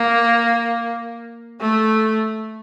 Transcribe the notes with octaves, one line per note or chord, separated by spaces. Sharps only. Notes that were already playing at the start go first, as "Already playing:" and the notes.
Already playing: A#3
A3